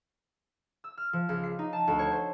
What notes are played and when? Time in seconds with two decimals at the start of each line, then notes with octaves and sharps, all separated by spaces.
0.84 E6
0.98 F6
1.13 F3
1.29 C#2
1.44 C7
1.59 D#4
1.73 A5
1.88 D2
1.99 C#5
2.12 C5